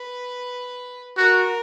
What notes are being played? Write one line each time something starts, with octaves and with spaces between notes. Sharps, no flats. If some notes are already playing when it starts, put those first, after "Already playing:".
Already playing: B4
F#4 A#4